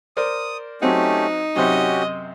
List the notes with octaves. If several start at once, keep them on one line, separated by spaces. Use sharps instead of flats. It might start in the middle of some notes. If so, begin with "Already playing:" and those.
A#4 C5 D5 D#6
F#3 A3 C4 C#4 D#4 G4 F#5
F#2 C3 C#4 F#4 G4 C5 D#5